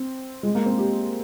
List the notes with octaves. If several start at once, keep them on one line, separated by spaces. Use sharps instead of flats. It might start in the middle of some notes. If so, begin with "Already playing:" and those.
Already playing: C4
G#3
A#3
C4
G4